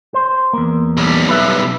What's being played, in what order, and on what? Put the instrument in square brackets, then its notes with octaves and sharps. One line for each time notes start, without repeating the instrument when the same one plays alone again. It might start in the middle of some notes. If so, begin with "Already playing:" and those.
[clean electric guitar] C5
E2 A#3
[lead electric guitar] B1 G3
[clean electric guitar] B4 E5